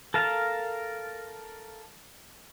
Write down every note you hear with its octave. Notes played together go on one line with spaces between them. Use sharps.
A4 A#4 F5 A5